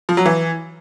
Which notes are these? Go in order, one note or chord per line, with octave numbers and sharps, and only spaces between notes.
F3
F#3
E3